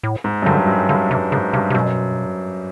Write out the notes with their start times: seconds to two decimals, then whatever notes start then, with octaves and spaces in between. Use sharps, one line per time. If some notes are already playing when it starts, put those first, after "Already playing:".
0.03 A2
0.24 G#2
0.43 F#2
0.46 G2 D3
0.68 F#2
0.89 G2 D3
1.10 G2 C3
1.32 G#2 C#3
1.53 G2 C3
1.70 C3
1.74 F#2 B2